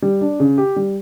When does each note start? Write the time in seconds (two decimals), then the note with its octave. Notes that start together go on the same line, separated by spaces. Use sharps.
0.02 G3
0.21 D4
0.40 C#3
0.58 G4
0.76 G3